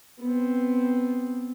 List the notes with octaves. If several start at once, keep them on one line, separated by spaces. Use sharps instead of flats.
B3 C4